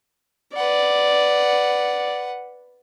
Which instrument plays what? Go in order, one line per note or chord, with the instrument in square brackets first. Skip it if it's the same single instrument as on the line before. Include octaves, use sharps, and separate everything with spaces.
[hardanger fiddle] B4 F#5 [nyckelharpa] D5